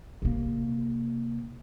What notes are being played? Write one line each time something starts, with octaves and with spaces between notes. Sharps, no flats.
C3 A#3